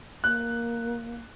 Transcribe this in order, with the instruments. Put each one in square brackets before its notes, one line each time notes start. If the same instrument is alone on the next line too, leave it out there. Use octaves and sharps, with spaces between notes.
[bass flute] A#3 [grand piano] F#6